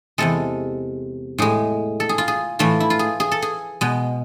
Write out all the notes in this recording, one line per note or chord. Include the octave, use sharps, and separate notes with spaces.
E2 C3 G#3 A4
A2 G#3 G#4
A4
G#4
F4
G#4
A2 E3 A3 F4
E4
F4
G#4
G#4
A4
G#4
B2 G#3